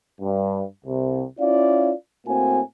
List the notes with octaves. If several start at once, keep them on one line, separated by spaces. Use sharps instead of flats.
G2
C2 C3
C#4 E4 F4 D5 F5
A2 A#3 C4 F#4 G#5